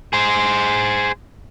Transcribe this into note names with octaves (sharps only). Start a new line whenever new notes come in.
G#4 C5